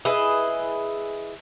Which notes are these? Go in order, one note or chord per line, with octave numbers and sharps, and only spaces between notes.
E4 G#4 B4 D#5